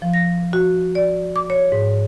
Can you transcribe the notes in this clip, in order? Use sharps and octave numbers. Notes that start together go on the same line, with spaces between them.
F3
A#6
F#4
D5
D6
C#5
G#2